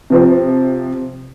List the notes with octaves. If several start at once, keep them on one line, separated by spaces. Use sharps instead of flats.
C3 F3 C4